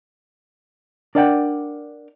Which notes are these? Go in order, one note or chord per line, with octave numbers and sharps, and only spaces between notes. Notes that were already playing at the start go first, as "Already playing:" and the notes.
D4 A#4 D5 D#5 F#5 G5